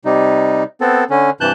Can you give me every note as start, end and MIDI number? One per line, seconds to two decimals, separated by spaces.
0.05 0.64 48
0.05 0.64 55
0.05 0.64 63
0.81 1.04 59
0.81 1.04 60
0.81 1.04 69
1.10 1.30 50
1.10 1.30 61
1.41 1.52 43
1.41 1.52 48
1.41 1.52 52
1.41 1.52 81
1.41 1.52 90
1.41 1.52 91